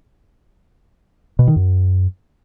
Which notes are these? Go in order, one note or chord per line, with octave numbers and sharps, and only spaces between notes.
B2
D#3
F#2